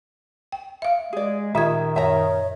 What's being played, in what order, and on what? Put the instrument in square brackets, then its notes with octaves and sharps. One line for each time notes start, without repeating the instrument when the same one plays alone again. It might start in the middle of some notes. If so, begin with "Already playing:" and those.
[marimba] G5
E5 F5
[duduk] G#3 [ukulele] G#4 D5
[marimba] A#2 F4 G#6 [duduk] D#3 [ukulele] E5
[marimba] F#2 [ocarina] C#5 [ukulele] E5 A#5